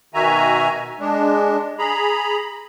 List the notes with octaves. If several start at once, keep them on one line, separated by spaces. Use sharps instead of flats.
B2 D#3 F#4 E5 G#5 A#5
G#3 D4
G#4 A#5 B5